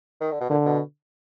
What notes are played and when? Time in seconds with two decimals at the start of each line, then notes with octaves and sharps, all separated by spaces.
0.21 D#3
0.31 D3
0.41 B2
0.50 A#2 D3
0.66 B2